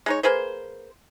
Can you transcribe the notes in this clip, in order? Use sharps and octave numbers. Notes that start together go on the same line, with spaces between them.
G#3 D#4 C#5
A#3 G#4 B4 C5